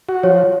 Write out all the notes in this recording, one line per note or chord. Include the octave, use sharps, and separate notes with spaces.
F#4
F3 C#5